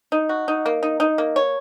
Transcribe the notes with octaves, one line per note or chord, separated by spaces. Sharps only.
D#4
F#4
D#4
A#3
D#4
D#4
A#3
C#5